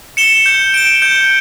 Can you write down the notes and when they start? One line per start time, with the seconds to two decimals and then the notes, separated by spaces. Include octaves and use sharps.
0.17 C#7 E7 G7
0.46 G6
0.74 D7 G7
1.02 G6